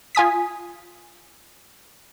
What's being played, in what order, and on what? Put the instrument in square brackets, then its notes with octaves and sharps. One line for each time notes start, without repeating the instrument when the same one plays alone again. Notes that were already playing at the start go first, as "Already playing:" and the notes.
[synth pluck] F4 G#5 D#6 B6